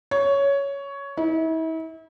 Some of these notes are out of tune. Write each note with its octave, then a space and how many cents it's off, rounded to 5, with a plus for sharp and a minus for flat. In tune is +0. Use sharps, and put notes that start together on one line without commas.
C#5 +10
E4 -40